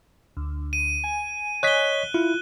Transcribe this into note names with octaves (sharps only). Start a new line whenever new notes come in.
D2
D#7
G#5
C#5 D#5 F#6 B6 G7
E4 F4